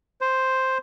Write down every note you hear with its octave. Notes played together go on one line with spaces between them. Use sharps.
C5